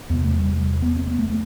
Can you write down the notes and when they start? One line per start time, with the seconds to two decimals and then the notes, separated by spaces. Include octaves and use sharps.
0.10 E2 C3 B3
0.24 A3
0.39 G3
0.82 B3
0.96 C4
1.07 B3
1.19 A3
1.30 A3